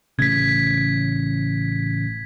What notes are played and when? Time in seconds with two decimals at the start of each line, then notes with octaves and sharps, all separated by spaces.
0.19 A1 A2 C#3 G#6 B6